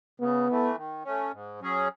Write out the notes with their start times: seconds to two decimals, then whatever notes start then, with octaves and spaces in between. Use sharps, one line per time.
0.20 C#3 B3
0.48 E3 A3
0.75 D#3
1.04 A3 C#4
1.32 G#2
1.60 F#3 C#4 G#4